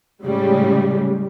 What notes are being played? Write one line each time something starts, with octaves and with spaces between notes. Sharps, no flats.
A2 C#3 G3 G#3